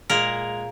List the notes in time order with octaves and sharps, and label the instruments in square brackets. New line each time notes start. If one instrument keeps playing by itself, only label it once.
[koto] A#2 G#3 A#4